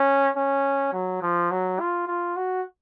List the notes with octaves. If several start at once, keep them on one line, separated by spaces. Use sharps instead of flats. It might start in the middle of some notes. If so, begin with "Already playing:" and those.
Already playing: C#4
C#4
F#3
F3
F#3
F4
F4
F#4